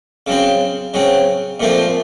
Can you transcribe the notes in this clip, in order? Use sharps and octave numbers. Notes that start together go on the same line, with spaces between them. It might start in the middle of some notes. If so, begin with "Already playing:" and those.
C#3 F#3 C4
C#3 F#3 C4
A#2 F3 A3 C4